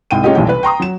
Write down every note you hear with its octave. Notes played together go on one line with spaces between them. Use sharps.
C2 G#2 G5 D#7
G#3 C#4 D#4 F4 G4 D#5
F1 B1 E3 G3 G4 G5
B4
G5 A#5 C6 D#6
F#3 E7